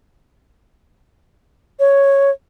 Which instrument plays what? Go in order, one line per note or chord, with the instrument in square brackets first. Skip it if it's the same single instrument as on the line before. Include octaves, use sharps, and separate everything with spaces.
[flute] C#5